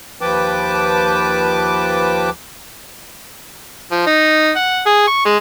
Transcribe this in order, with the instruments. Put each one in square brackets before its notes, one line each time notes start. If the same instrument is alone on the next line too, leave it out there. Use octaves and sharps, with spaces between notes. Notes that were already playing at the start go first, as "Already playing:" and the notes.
[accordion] D#2 F3 B4 G5 A5 D6
[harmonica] F3
D#4
F#5
G#4
C#6
G#3